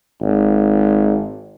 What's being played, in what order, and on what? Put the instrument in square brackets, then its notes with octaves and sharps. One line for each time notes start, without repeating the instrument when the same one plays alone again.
[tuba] G#1